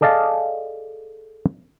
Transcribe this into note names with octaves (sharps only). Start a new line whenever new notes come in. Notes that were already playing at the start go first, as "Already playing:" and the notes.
G#4 A4 D5 D#5 F5 A5